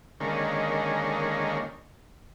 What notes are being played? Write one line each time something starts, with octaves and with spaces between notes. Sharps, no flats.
D3 D#3 G#3 A#3 C#4